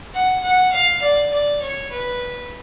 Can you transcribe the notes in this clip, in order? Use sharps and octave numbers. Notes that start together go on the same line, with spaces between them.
F#5
F#5
F5
D5
D5
C#5
B4